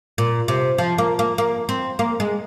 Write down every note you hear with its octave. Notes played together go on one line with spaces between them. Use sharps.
A#2
C3
F3
A#3
A#3
A#3
C4
A#3
G#3